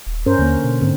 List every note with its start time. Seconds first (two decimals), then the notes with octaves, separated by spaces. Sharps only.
0.06 D#1
0.26 G2 C#4 A#4 C5
0.38 D#2 D3 A#3
0.64 B2
0.81 G#2 D3 C4